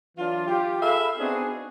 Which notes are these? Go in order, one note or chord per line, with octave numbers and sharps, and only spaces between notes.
E3 F#3 D4 F4
F4 G4
G#4 A4 E5 F5 B5
B3 C4 D4 D#4 F#4 G#4